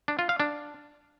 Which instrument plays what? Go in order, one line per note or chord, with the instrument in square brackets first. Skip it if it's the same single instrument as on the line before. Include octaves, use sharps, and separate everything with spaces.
[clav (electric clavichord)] D4
F4
F5
D4